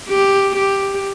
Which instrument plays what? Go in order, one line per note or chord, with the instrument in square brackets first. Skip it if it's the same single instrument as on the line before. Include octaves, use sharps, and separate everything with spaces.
[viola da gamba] G4
G4